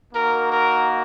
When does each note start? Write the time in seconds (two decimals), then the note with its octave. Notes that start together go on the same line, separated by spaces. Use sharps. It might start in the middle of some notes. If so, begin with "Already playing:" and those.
0.12 A#3 D#4 F#4 A#4
0.49 A#4